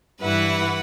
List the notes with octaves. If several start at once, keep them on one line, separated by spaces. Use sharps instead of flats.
G2 E3 E4 B4 F#5